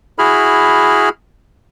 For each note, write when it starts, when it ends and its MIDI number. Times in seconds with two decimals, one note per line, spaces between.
0.19 1.09 64
0.19 1.09 66
0.19 1.09 68
0.19 1.09 83
0.19 1.09 89